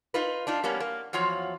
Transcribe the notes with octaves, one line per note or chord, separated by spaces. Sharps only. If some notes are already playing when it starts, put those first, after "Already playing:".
D#4 F4 B4
D4 D#4 F4
G3 A#3 B3 C#4
A#3
E2 F3 F#3 F4 C#5